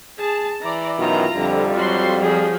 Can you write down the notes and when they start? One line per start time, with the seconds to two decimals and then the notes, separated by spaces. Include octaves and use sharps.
0.19 G#4 A5
0.62 E3 D5 A#5
0.99 F#2 B2 D#3 F4 A#5
1.36 F2 D3 G3
1.76 F#3 F#4 C6
2.21 F3 F#3 G#4